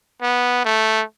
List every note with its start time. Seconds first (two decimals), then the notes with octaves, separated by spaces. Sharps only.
0.22 B3
0.65 A3